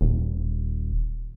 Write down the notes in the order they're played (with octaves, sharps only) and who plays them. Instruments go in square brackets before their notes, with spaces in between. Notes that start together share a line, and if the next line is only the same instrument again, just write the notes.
[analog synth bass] D#1